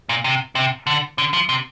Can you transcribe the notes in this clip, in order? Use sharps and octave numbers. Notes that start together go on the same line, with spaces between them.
A#2
C3
C3
D3
D3
F3
C3